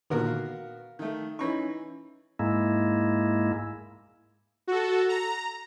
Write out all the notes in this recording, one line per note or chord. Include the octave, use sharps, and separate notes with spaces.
A#2 D3 D#3 B3 F#4 A#4
F5
D#3 A3
E3 C#4 D#4 B5 C#6
G#2 G#3 A#3 E4
F#4 A4
A#5